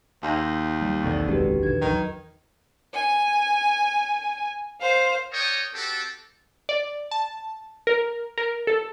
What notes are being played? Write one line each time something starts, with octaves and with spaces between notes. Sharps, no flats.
D#2 C6 G6 A#6
G3
B1 E2 D#3 C4 A4 D5
F#1 G#3 C#4 F#4 G4 B4
A#1 D3 B4 G#6
E2 D#3 F#3
G#5
C5 F5
A#4 C#5 D5 G5 C#6 D#6
C4 F#4 G4 A4
D5
A5
A#4
A#4
A4